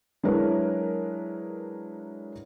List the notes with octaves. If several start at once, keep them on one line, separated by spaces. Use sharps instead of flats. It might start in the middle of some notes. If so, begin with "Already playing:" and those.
F#3 G#3 D4 E4 A#4 B4